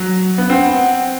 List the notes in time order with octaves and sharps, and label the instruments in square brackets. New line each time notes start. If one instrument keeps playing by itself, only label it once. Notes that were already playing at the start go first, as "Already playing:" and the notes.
Already playing: [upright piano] F#3
B3
[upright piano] C4 [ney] F#5